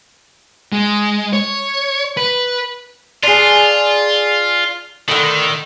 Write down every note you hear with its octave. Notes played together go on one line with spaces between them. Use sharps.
G#3
C#5
B4
D4 F4 G#4
A2 D3 D#3